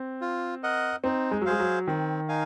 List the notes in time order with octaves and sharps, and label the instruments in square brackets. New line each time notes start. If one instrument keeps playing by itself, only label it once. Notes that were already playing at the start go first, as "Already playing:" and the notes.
Already playing: [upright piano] C4
[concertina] F4
A#4 D#5 F#5
[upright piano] C4 [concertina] D#4
[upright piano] G#3
F#3
[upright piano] G#3 [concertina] G#4 C5 F5
[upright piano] F#3
[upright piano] D#3 [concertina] C4
[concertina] D#4 A#4 F5 G#5